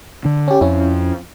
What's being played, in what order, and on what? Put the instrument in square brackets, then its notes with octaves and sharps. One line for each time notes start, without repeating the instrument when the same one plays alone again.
[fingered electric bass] D3 D4
[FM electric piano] C#4 G4
[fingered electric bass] F2 [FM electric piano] C#4 E4